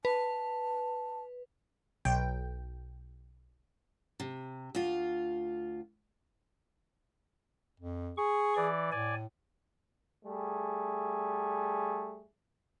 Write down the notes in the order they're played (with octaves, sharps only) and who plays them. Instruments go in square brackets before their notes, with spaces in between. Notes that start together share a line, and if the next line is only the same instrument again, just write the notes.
[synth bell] B4 [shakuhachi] A5
[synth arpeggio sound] B1 G5
[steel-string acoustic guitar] C3
D2 F4
[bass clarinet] F2
[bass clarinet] G#4 [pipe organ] C#6
[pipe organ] E3 D5
[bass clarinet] A2 [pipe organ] D5 G#5
[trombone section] G3 A3 G#4